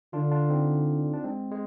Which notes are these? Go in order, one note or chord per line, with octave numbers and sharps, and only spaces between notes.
D3 D4 F4
D4 F4
C4 D#4
D4
G#3 C4
G#3